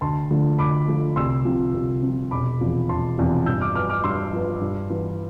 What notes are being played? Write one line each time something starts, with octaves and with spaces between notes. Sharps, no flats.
D2 A5 C6
D3 F3 A3
D2 B5 D6
D3 F3 A3
C2 C6 E6
C3 F3
C2
C3 F3
E1 B5 D6
E2 C3 F3
E1 A5 C6
E2 C3 F3
G2 E6 G6
D6 F6
F3 B3 D6 F6
D6 F6
G2 C6 E6
F3 B3
G2
E3 B3 F4